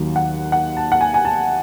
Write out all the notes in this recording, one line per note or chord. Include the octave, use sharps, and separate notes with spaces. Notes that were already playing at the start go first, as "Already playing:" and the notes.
Already playing: D#2 D#3 F#3
F#5
F#5
A5
F#5
G#5
G#5
A5